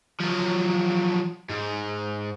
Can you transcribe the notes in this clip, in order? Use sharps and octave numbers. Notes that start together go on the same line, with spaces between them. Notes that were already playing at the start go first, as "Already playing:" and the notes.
F3 F#3
G#2